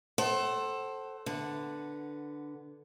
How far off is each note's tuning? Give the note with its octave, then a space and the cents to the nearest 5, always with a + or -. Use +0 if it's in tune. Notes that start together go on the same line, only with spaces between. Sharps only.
A4 +0 C5 +20 F#5 +35
D3 +0 B3 +0